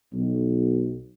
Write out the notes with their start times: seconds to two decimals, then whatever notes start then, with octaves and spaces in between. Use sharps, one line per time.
0.13 B1